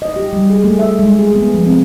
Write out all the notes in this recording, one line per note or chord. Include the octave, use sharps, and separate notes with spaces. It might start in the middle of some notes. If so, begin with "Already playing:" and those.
D#5
G4
G3
G#4
A3
E5
G#3
G#4
B3
F3
C4